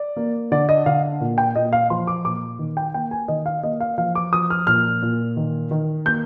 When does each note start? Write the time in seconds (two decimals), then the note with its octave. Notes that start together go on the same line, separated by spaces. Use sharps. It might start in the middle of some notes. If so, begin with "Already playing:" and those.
Already playing: D5
0.16 A#3
0.51 D3 D5
0.69 D#5
0.86 D3 F5
1.21 A#2
1.38 G5
1.55 A#2 D#5
1.73 F5
1.90 F3 C6
2.07 D6
2.25 A#2 D6
2.59 D#3
2.77 G5
2.94 A#3 G5
3.11 G#5
3.28 D#3 D#5
3.46 F5
3.63 A#3 D#5
3.80 F5
3.98 F3 F5
4.15 D6
4.33 F3 D#6
4.50 F6
4.67 A#2 F6
5.02 A#2
5.37 D#3
5.71 D#3
6.05 A#3 G6